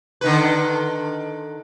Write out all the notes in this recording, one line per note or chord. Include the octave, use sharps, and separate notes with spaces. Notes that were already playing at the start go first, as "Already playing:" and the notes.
D3 D#3 B4